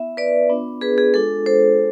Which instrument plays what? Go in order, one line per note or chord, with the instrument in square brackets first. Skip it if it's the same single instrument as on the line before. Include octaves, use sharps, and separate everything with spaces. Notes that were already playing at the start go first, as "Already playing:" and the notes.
Already playing: [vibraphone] B3 E4 E5
B4 D5
B3 D4 F4
G#4 B4
G#4
G#3 D4 F4 A4
A4 C5